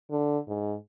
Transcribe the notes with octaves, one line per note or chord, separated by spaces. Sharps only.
D3
G#2